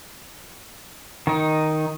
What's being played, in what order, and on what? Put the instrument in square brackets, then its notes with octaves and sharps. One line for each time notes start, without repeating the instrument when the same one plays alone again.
[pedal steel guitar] D#3 D#4